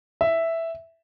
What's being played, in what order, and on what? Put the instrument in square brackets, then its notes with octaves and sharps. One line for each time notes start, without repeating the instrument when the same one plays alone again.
[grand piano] E5